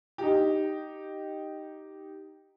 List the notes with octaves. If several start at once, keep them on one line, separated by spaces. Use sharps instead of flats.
D#4 G4